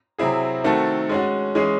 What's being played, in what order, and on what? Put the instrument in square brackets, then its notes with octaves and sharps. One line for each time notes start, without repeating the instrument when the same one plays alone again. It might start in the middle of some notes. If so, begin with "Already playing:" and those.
[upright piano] C3 F#3 C4 E4 G#4
D#3 A3 C4 F#4 A4
G#3 C#4 F#4
E3 G#3 C#4 G#4